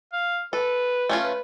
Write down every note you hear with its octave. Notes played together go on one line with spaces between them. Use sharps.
F5
A4 B4
A3 C#4 F4
B4